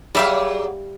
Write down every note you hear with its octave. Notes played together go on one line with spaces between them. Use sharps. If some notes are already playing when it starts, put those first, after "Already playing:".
F#3 G3 G#4 D5 E5 F5